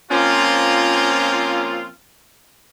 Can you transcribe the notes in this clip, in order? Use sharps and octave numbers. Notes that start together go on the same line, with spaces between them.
F3 A#3 C4 C#4 F4